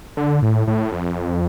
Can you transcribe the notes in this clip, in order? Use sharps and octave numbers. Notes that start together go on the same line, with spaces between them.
D3
A2
A2
F2